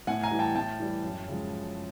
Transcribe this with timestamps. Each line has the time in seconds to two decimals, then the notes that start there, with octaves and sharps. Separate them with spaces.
0.07 A2 F#5 G#5
0.23 G#5 A#5
0.31 E3 G3
0.39 G5 A5
0.55 A2 G5 A5
0.80 E3 G3
1.04 F#2
1.28 C#3 F3 G#3